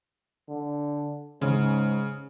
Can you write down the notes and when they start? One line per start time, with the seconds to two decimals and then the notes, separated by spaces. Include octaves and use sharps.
0.48 D3
1.42 G#2 C#3